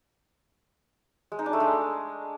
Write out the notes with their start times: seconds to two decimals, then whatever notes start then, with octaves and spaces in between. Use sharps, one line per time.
1.32 G#3
1.39 D#4
1.46 D4
1.53 A3
1.60 G#3